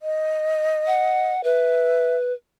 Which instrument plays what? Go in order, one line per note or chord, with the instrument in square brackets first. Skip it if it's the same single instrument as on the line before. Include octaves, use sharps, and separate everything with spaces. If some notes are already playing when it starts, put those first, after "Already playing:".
[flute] D#5
[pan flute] F#5
[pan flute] B4 [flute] E5